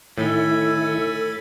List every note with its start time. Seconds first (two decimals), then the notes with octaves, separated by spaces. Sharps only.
0.18 A2 D#3 E4 A4 G#5 B5 A6